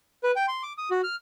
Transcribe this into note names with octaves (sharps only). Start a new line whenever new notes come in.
B4
G5
C6
D6
D#6
F#4
F6